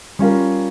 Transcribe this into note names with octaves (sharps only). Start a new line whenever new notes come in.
G3 C#4 F4 A#4